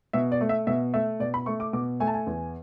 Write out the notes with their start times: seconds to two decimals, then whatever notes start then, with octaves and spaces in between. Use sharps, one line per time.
0.13 B2 E5
0.32 D5
0.41 A3
0.49 E5
0.67 B2 E5
0.94 A3 E5
1.20 B2 D5
1.34 B5
1.46 A3 C#6
1.60 D6
1.73 B2 D6
2.00 A3 G#5
2.07 A5
2.14 G#5
2.27 E2